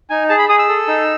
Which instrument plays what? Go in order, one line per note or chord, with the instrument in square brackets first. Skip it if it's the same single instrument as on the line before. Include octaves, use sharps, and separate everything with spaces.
[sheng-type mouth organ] D#4 G#5
G#4 A5
B5
G#4 D#6
E6
A4
D#4